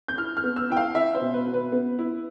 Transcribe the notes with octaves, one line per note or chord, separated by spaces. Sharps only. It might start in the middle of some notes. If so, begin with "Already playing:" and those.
G6
E4 F6
F6
B3
E6
E4 G5
F5
E4 E5
C5
B2
B4
B2
B4
B3
E4